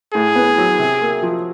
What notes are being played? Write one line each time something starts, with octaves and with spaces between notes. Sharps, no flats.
A2 G#4
B3
F#3
C3
A#3
F3